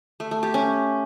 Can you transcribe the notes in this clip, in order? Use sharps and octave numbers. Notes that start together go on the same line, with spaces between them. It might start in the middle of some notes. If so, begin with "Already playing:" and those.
A3
A3
G4
C#4